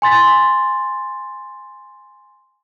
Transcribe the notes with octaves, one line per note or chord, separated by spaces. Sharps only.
G#5 C6 A6 B6